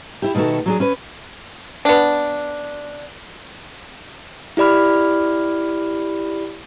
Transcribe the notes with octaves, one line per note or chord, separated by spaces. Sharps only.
E4 G4
B2 D#3 A3 F#4 A4
F#3 D4 G#4
C#4 B4
B3 D4
E4 G4 D5 B5 F6